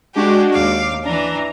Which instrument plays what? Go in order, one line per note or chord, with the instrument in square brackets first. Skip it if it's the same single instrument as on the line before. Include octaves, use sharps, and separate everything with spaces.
[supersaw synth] G#3 D4 F#4 [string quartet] G4
[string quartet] D#2 F5 [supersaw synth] D6
[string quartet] E3 D4 [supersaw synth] A#5